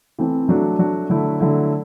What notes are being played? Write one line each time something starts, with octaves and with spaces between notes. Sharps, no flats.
E3 A3 C4
F#3 A3 D4 F#4
F#3 A3 D4 F#4
D3 F#3 A3 E4
D3 F#3 A3 E4